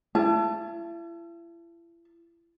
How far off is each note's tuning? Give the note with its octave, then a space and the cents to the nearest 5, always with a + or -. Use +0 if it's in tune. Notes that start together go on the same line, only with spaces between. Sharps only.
E4 +40 A5 +0